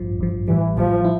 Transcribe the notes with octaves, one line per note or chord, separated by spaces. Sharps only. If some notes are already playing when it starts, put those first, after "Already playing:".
Already playing: A1 G2 F3
A1 G2 F3
A1 A2 E3 G3
A1 A2 F3 G3
E4